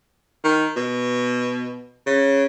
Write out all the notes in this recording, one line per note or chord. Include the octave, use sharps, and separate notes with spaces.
D#3
B2
C#3